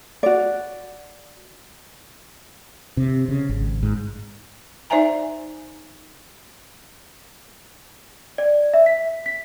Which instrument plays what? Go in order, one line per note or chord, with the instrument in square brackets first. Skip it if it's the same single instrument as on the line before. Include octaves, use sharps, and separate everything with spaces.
[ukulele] F#4 D5
[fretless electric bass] C3
C#3
G#1
G#2
[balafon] D#4 C5 D5 E5 G#5 A#5
[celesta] D5
E5
B6
B6